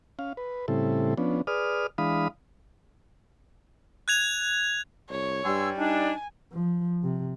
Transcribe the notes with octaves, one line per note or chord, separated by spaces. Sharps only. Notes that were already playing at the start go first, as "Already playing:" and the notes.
C#4 F5
B4
A2 C#3 G3 C4 E4 A4
F3 B3 C#4 D4
G#4 B4 D5 D#6 F6
E3 G#3 D4 F5 B5 D#6
F#6 G#6 F7
C2 C#5
G2 G3 G#5 C6 E6
D4 D#4 G#5
F3
C3